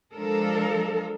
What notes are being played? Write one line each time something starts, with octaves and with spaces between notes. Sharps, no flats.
F3 G#3 D4 A4 A#4